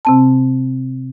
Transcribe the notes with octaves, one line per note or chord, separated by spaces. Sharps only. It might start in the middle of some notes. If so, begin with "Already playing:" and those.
C3 C4 A5